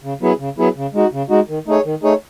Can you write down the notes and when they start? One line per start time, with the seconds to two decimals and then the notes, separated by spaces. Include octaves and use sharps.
0.03 C#3
0.21 F#3 B3 E4 G#4
0.39 C#3
0.58 F#3 B3 E4 G#4
0.77 C#3
0.94 G#3 D#4 F#4
1.12 C#3
1.30 G#3 D#4 F#4
1.49 D#3
1.67 A3 D#4 G#4 C#5
1.85 D#3
2.03 A3 D#4 G#4 C#5